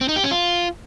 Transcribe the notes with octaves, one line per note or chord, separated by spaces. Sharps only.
C4
D#4
G4
C#4
F4